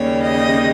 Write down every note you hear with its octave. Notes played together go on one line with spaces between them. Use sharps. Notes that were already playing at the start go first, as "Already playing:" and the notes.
Already playing: D#2 C#3 G3 C#5
D#5